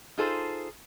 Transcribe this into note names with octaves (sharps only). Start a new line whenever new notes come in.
D#4 F4 G#4 A4 C5